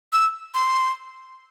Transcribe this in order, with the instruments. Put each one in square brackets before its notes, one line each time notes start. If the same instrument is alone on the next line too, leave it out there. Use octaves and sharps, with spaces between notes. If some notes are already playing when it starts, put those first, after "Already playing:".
[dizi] E6
C6